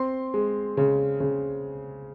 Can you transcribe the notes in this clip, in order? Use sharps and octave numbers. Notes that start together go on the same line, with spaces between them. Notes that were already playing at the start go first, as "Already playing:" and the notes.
Already playing: C4 C6
G#3
C#3
C#3